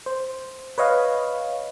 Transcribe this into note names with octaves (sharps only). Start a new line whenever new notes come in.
C5
B4 C#5 D#5 F5